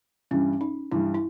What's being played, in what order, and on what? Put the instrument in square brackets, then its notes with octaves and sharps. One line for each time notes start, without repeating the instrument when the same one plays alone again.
[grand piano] G2 E3 G3 [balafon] C#4
[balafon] D#4
[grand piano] G2 E3 G3 [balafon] E4
[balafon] E4